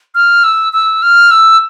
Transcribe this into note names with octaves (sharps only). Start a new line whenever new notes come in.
F6
E6
E6
F6
E6